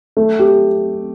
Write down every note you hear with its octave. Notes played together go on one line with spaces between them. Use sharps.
A3
G4